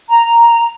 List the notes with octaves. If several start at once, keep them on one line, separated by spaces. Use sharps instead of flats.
A#5